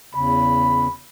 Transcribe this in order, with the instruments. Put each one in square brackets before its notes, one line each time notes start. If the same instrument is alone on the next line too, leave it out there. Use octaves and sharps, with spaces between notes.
[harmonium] E2 C#3 [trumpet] B5